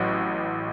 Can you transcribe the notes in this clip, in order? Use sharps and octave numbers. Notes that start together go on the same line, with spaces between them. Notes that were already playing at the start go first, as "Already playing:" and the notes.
Already playing: A1 A2 F#3